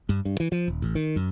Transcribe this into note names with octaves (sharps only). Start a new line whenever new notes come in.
G2
G2
E3
F3
D#1
A1
D#3
F#2